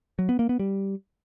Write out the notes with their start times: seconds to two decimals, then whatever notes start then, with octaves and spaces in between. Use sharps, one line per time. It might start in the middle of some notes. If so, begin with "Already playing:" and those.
0.19 F#3
0.29 B3
0.39 A#3
0.49 B3
0.59 G3